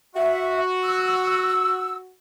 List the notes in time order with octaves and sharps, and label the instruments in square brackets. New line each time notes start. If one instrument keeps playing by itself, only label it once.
[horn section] F#4 [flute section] E5
[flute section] E6